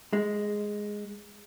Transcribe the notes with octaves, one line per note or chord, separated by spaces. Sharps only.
G#3